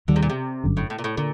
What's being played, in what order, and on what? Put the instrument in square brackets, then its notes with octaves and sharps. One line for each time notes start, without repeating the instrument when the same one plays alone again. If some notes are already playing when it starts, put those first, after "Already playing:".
[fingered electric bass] D#2 D#3 G3 [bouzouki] D3
[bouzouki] C3
A#2
C3
[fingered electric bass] G1 F#2 D3
[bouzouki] A2
A2
A#2
A2
[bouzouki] A#2 [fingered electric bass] D3